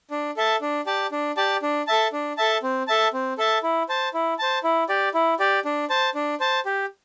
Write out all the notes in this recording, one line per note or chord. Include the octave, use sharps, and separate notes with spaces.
D4
A4 E5 A5
D4
G4 D5 A5
D4
G4 D5 A5
D4
A4 E5 A5
D4
A4 E5 A5
C4
A4 E5 A5
C4
A4 E5 A5
E4
C5 A5
E4
C5 A5
E4
G4 D5
E4
G4 D5
D4
C5 A5
D4
C5 A5
G4